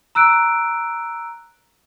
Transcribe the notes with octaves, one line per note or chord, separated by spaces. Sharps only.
A#5 E6 F#6 D7